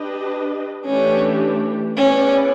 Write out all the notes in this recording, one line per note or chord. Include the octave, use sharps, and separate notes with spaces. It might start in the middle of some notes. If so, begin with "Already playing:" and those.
Already playing: D4 G4 B4 D#5
E3 A3 C#4 D4 G4
B3 C#4 E4 G#4 B4 D5